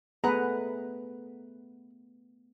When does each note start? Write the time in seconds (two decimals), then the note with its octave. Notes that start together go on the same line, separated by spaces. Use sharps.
0.24 A3 B3 G#4 B4 F#5 A#5